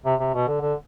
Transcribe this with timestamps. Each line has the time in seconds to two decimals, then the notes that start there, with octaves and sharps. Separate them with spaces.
0.05 C3
0.20 C3
0.34 B2
0.48 D3
0.61 D3